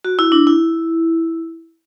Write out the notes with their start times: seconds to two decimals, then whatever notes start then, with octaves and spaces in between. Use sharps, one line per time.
0.05 F#4
0.19 E4
0.32 D4
0.47 E4